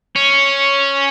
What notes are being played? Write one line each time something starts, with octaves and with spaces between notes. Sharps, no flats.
C#4